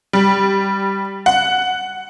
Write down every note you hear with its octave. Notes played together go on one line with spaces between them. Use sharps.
G3
F#5